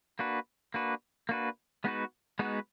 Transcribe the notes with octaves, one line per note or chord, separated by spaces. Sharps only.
A#3 D4 F#4 B4
A#3 D4 F#4 B4
A#3 D4 F#4 B4
G#3 B3 D#4 F#4 B4
G#3 B3 D#4 F#4 B4